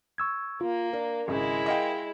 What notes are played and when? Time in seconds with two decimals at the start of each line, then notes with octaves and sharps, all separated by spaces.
0.18 C#6 E6 G#6
0.61 A#3 F4
0.93 D4 A#4
1.28 G#1 C#3 G#3 E4
1.66 D#5 F5 G5